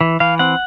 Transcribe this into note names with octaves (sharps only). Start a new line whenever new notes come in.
E3
E3 F5
C4 F#5